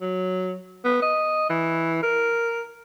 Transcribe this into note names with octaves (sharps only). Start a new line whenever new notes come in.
F#3
B3
D#5
E3
A#4